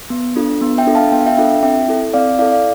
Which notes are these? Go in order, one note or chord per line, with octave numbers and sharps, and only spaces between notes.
B3
D4 F4 A4
B3
E5 G5
D4 F4 A4
F5 A5
B3 G5
F5
E5 G5
D4 F4 A4 E5 G5
C4 E5 G5
E4 A4
C4 D5 F5
E4 A4 D5 F5
D5 F5